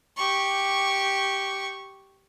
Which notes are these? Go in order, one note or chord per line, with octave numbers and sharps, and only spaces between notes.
G4 C#6